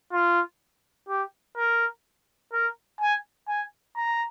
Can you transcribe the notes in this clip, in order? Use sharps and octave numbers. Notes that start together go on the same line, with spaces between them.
F4
G4
A#4
A#4
G#5
G#5
A#5